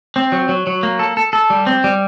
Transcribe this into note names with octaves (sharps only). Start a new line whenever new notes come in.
C4
F#3
F#3
F#3
A#3
A4
A4
A4
G3
C4
G3